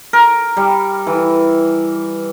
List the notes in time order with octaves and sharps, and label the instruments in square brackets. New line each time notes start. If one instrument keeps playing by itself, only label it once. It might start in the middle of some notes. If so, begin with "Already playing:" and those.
[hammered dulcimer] A#4
G3
E3